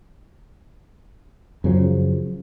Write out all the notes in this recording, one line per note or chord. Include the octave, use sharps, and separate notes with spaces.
F#2 C#3 F3